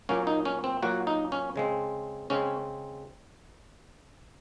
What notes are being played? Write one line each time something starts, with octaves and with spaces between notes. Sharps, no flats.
A#2 F#3 A#3 C#4
D#4
C#4
C4
A#2 F#3 A#3 F#4
D#4
C#4
C#3 G#3 C4
C#3 G#3 C4 C#4